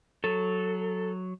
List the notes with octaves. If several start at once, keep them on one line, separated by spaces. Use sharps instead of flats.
F#3 A4